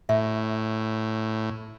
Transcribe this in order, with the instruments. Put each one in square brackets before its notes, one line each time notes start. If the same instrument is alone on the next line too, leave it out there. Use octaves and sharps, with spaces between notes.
[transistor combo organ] A2 [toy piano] E5